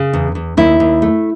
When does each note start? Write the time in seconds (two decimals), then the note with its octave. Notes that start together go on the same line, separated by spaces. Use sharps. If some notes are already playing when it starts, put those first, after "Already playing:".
Already playing: C#3
0.13 E2
0.35 E2
0.57 D#2 E4
0.80 D#2
1.02 A3